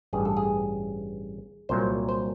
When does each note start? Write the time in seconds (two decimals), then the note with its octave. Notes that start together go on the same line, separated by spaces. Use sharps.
0.13 A1 G2 E3 G3 G#4
0.25 A4
0.37 G#4
1.69 C2 A#2 F#3 C5
2.09 C5